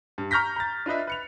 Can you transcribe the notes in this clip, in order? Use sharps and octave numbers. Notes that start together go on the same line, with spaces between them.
G2
A#5 C#6 F6 G6 A#6 B6
A#5 A6
D4 F4 B4 D#5 E5
B4 C#7 F7